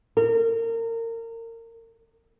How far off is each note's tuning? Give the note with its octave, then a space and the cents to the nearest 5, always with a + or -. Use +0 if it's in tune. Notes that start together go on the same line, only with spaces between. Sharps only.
A#4 -30